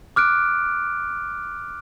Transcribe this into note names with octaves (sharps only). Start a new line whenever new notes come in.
D6 F6 F#6 D7